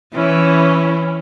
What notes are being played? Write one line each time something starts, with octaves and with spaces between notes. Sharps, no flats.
E3 C#4 E4 C#5